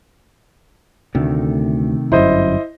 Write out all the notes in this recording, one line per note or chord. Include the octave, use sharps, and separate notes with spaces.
D2 C3 D#3 A3
G1 F#2 E4 C5 D#5